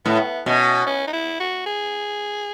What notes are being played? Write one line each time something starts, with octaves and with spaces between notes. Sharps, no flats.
A2 B3
B2 C#4
C#4
D#4
E4
F#4
G#4